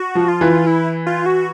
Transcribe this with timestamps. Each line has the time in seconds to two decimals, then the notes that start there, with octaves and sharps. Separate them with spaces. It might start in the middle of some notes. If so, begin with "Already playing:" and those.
Already playing: F#4
0.15 F3
0.28 F4
0.41 E3
0.67 E4
1.07 F4
1.26 F#4